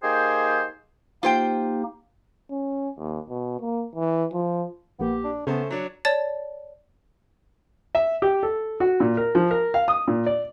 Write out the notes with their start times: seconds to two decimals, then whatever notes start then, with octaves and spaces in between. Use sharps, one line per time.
0.03 A#3 D#4 G4 G#4 C5 G5
1.23 A#3 D#4 F4 G4 C5 G5
2.51 C#4
2.98 D#2
3.30 B2
3.60 A#3
3.95 E3
4.33 F3
4.99 A#1 A#3 B3 G4
5.24 D4
5.47 C#3 A3 B3 C#4 C5 A5
5.71 F#3 D4 C#5
6.05 C#5 D5 A5 A6
7.95 E5
8.22 G4
8.43 A4
8.80 F#4
9.00 A#2
9.17 A#4
9.35 F3
9.51 A#4
9.74 F5
9.88 D#6
10.08 A#2
10.26 D5